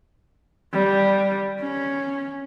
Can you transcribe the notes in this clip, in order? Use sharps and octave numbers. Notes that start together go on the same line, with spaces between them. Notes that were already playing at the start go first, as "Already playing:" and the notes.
G3
C#4